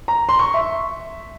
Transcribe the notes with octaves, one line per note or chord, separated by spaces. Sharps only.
A#5
C6
C#6
E5